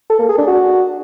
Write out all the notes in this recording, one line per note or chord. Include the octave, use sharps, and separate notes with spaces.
A4
A#3
G#4
D4
F#4